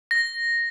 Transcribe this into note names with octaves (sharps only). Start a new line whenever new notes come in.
A#6